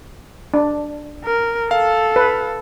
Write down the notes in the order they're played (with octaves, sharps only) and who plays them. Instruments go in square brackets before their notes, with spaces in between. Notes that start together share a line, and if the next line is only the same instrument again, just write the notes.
[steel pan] D4
[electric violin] A#4
[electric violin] A4 [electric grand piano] F5
[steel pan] B4